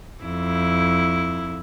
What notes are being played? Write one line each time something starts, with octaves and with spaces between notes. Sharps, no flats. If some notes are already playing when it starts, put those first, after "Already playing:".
F2 E4